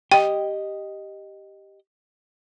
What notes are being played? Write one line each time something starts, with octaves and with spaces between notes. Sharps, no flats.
G4 D#5 G5